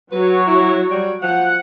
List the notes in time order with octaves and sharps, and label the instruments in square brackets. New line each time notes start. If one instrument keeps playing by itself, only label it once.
[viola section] F#3 F#4 C#5 [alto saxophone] B4
[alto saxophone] E4
G3
[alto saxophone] F3 [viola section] F#5